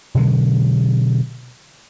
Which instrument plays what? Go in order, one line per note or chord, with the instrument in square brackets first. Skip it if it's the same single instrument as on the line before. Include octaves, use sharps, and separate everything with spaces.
[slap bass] B2 D3 F#3 G#3